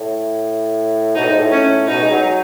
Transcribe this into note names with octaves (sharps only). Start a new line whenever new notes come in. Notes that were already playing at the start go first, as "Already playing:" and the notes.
Already playing: A2
B2 D#4
A2
G#2
A2
C#4
B2 D#4
G#3
F#3